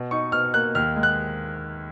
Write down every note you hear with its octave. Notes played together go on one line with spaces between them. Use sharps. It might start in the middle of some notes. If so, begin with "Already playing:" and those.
Already playing: B2
D#4 C#6
B2 F6
A#3 F#6
D#2 F6
G#3
F#6